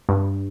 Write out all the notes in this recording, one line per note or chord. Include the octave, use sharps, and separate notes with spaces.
G2